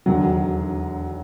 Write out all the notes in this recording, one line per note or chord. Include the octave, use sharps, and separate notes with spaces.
E1 D#2 D3 F#3